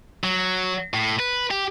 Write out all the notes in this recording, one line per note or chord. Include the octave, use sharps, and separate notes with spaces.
F#3
A2
B4
G4